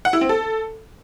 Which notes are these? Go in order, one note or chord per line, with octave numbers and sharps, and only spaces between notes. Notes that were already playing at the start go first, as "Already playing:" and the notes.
F#5
E4
C4
A4